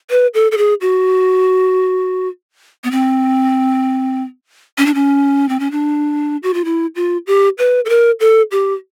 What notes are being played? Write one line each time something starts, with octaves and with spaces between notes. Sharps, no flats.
B4
A4
A4
G#4
F#4
B3
C4
C#4
D4
C#4
C4
C#4
D4
F#4
F4
E4
F4
G4
B4
A4
A#4
A4
G4